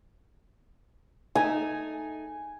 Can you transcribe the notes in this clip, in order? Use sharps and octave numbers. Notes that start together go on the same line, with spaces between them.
A3 D#4 G#5